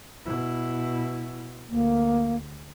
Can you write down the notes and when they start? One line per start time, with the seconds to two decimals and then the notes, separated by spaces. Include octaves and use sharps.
0.25 B2 E4
1.70 D2 A#3